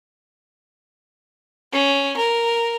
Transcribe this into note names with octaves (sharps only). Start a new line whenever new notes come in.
C#4
A#4